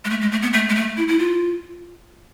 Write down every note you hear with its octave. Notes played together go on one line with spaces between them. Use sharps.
G#3
A3
G#3
A3
B3
A3
G#3
A3
E4
E4
F4